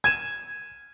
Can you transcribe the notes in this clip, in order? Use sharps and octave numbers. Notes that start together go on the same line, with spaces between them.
G#6 D#7 E7